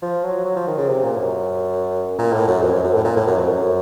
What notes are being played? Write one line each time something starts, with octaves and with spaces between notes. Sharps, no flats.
F3
F#3
F#3
F3
D#3
C#3
C3
A#2
F#2
A#2
A2
F#2
F2
F#2
F#2
A2
A#2
A2
F#2
F2
F#2